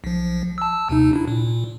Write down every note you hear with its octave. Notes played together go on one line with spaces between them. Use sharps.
B1 F3
A5 E6
D#2 C3 D#4
D4 E4
A#2